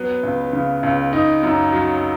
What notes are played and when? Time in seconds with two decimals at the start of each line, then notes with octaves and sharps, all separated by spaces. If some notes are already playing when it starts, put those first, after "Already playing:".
Already playing: F#3 B3 B4
0.23 C#2
0.53 C#3
0.83 C#2
1.13 D#4
1.43 F#2
1.72 F#3